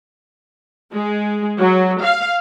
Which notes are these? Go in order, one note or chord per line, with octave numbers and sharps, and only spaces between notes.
G#3
F#3
F5